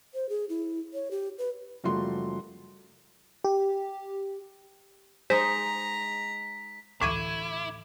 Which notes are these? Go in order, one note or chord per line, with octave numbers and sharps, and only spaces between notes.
C5
G#4
E4
C#5
G4
B4
F#1 F3 G3 A3 F#4 C6
G4
G#3 D#4 C5 A#5 B6
A1 D2 A2 E3 E4 D6 G#6 D#7